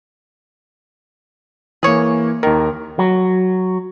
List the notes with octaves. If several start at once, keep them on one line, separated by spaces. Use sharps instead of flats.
E3 A#3 G#4 C#5
D#2 D#3 A#4
F#3